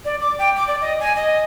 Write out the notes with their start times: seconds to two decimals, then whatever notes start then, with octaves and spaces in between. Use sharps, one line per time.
0.05 D5
0.21 D6
0.39 G5
0.56 D6
0.68 D5
0.81 D#5
1.00 G#5
1.16 D#5